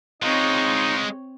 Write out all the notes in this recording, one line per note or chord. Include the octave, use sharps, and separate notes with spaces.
G#3 C4 D#4 F4 C#5